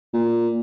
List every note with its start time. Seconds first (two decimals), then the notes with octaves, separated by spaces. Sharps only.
0.13 A#2